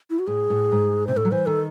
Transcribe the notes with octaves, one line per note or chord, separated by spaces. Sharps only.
E4
F#4
A2 G#4
A2
G#2
C3 C5
A2 A4
F#3
E3 C5
D#3 A4